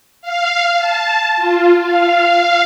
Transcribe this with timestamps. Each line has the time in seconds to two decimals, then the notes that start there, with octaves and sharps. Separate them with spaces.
0.22 F5
0.77 A5
1.36 F4
1.78 F5